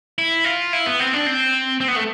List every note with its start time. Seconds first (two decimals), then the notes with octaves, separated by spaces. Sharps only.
0.18 E4
0.44 F4
0.73 E4
0.86 B3
0.99 C4
1.13 D4
1.27 C4
1.81 C4
1.88 B3
1.96 A3